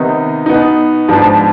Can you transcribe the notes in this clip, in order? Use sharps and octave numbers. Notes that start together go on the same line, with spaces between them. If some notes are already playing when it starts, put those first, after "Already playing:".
Already playing: C3 D#3 B3 D#4
B2 B3 D#4
G#2 F3 B3 D4